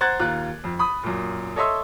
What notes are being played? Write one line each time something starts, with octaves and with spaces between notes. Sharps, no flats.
C5 F#5 A#5 F#6 G#6 A6
D#2 F4 A#5 F#6
F2
B5 D#6
F#2 A#2
A4 C#5 D#5 E5 C6 E6